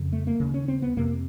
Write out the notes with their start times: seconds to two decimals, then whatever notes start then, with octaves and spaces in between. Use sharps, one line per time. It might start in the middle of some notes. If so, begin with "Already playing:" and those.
Already playing: F2 C#3
0.12 A3
0.27 A#3
0.40 D#2 C#3
0.54 C#4
0.68 C4
0.82 B3
0.97 F2 C3 A#3